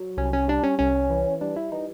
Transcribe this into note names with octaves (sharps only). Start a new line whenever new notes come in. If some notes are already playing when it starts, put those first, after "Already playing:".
Already playing: F#3
C2 C#4
C#4
G3 D4
C#4
C2 C#4
E3
G3 D4
E4
E3 D#4